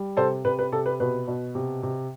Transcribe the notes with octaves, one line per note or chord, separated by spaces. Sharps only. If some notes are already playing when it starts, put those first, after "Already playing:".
Already playing: G3
C3 A4 C5
C3 B4
B4
C3 A4
B4
B2 B4
B2
C3
C3